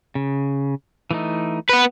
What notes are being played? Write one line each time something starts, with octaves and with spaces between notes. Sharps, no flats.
C#3
E3 A3 D#4
B3 B4